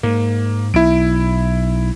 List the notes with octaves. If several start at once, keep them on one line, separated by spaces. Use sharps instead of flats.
G#2 A#3
B1 E4 D7